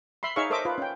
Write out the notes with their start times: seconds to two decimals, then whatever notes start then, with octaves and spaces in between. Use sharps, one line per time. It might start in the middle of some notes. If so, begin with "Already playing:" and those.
0.23 E5 B5 C6
0.36 D#4 G#4 C#5 E5 F5 C#6
0.50 A4 A#4 C5 D#5 E5 D6
0.65 F4 B4
0.78 C#4 G5